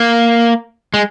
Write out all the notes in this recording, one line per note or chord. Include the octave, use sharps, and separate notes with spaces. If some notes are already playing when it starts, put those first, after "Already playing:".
Already playing: A#3
G#3